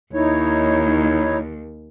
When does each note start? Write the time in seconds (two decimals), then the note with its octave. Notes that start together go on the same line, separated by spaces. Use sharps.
0.14 D#2 D#4 E4 C#5